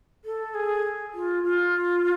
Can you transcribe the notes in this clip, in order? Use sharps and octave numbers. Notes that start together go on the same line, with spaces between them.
A4
G#4
F4
F4